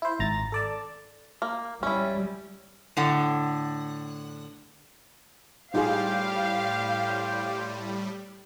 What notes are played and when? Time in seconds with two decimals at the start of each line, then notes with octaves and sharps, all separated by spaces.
0.02 E4 C5
0.19 G#1 A#5 A6
0.52 A4 D5 A5
1.42 A#3
1.83 G3 C#4 E4
2.97 A2 D3 F#5
5.74 A2 G3 D#4 F4 G4 G#4 C5 F5